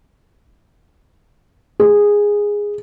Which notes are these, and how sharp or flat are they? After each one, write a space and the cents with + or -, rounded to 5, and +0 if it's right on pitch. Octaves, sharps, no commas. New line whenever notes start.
G#4 -10